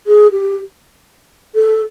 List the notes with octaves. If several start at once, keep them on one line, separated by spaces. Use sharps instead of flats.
G#4
G4
A4